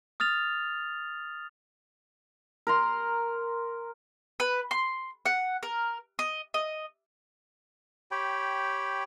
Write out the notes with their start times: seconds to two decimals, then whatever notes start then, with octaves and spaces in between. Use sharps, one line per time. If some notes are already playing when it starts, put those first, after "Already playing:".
0.20 D#6 F6 A6 F7
2.67 A#4 A#5 C6
4.40 B4
4.71 C6
5.26 F#5
5.63 A#4
6.19 D#5
6.54 D#5
8.11 G4 C#5 G5 B5